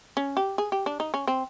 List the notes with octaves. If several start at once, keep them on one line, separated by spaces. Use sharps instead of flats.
C#4
G4
G#4
G4
D4
D#4
C#4
C4